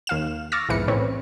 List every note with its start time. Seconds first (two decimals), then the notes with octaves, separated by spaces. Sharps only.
0.07 D#2 F5 E7
0.52 C#6 D6 E6 F6 A6 A#6
0.69 B1 F2 G#2 E3 B4 C#7
0.88 A2 C#3 C4 C#4 B4 C#5